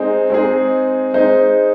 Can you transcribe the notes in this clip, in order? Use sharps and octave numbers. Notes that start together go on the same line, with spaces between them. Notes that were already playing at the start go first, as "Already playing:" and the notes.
Already playing: G#3 C4 D#4 G#4
G#3 C4 D#4 G#4
G#3 D#4 C5